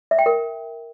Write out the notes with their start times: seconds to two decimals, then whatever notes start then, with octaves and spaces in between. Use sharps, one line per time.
0.11 E5
0.19 G5
0.26 A#4